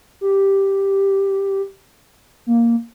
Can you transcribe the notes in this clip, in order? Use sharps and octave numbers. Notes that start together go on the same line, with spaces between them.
G4
A#3